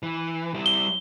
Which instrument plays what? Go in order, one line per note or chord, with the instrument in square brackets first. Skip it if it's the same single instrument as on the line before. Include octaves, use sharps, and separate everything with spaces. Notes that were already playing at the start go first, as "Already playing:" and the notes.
[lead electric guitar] E3
G3 E4
[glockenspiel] G7